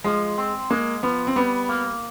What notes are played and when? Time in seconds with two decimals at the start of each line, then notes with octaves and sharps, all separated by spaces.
0.04 F3 G#3
0.38 C4
0.70 G#3 A#3
1.03 F3 B3
1.27 C4
1.36 G3 B3
1.69 A#3